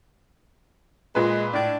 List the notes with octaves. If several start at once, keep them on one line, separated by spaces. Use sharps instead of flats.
A#2 G#3 B4
A2 D4